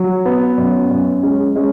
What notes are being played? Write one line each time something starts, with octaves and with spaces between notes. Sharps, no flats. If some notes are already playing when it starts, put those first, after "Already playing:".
Already playing: F#3
B3
F#2
F#2
G#3 C#4
G#3 C#4